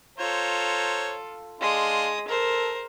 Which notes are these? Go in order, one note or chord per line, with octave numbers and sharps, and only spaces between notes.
F4 A4 C5 C#5 A#5
G#3 D4 F5 C6 D#6
A4 A#4 C5